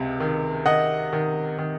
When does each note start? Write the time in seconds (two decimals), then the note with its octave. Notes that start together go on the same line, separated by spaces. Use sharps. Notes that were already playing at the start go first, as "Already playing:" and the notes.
Already playing: C#2 C3
0.20 D#3
0.66 D#3 D#5 F#5
1.13 D#3
1.58 D#3